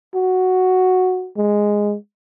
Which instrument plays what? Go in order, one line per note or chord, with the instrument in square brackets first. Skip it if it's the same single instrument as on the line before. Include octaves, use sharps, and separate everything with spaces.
[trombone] F#4
G#3